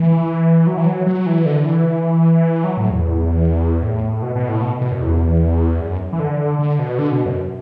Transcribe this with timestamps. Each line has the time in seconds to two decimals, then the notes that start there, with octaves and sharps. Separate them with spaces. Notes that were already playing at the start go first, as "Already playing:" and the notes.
Already playing: E3
0.67 F#3
0.78 E3
0.86 F#3
1.07 F#3
1.26 E3
1.46 D3
1.66 E3
2.64 F#3
2.77 A2
2.91 E2
3.83 A2
4.22 B2
4.36 B2
4.49 A2
4.62 B2
4.81 B2
4.92 F#2
5.02 E2
5.80 F#2
6.13 E3
6.20 D3
6.59 D3
6.79 B2
6.99 D3
7.12 B2
7.26 F#2